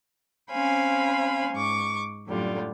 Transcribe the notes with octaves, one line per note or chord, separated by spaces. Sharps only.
C4 C#4 C5 F5 G#5 B5
G#2 C#6 D6
F#2 A2 D3 G3 F4